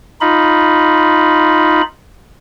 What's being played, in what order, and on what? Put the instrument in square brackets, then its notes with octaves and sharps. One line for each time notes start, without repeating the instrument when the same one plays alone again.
[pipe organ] D#4 F4 B5